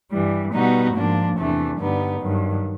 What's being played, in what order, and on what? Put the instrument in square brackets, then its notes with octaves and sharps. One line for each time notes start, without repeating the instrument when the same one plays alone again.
[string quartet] G2 E3 G3
B2 G3 B3 D#4 F#4
G#2 F3 A#3 D4
E2 C3 E3 A3 D4
G2 D3 G3 B3 D#4
G2 D#3 F#3